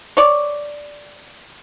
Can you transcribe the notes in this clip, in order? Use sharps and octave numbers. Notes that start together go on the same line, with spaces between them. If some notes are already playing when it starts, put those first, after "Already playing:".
C#5 D5